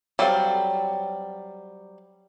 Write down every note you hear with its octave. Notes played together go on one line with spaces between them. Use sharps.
F#3 G3 C4 A4 F5